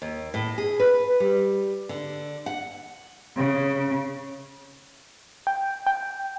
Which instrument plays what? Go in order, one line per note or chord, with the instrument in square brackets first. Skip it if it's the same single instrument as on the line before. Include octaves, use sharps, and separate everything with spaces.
[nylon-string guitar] D#2
A2
G#4
B4
G3
D3
F#5
[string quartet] C#3
[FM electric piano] G5
G5